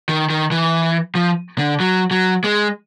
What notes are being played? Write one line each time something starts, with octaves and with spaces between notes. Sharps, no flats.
D#3
D#3
E3
F3
D3
F#3
F#3
G#3